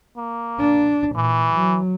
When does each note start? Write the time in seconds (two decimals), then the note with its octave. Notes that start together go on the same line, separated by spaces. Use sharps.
0.17 A#3
0.60 D4
1.16 A#2 E3
1.55 F#3